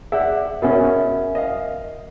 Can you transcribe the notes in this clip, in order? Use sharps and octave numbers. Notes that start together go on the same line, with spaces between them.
G#4 D5 E5 F#5
B2 C#4 A#4 E5 F#5
D#5 F5